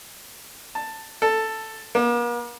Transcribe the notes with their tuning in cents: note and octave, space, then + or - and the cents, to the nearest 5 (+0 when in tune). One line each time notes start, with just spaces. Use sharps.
A5 +10
A4 +5
A#3 +45